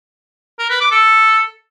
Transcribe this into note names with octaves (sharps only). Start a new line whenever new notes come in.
A#4
B4
D6
A4